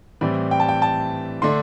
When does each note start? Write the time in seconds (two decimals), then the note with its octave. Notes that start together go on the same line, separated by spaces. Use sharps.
0.21 A2 E3 G3 C4 E4 D5
0.51 G5
0.60 A5
0.69 G5
0.82 A5
1.42 D3 A3 D4 C6